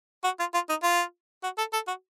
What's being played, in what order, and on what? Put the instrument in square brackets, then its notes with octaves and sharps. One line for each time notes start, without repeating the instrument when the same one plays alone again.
[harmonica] F#4
F4
F4
D#4
F4
F#4
A4
A4
F#4